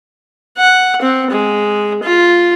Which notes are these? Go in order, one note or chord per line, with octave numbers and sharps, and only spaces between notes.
F#5
C4
G#3
F4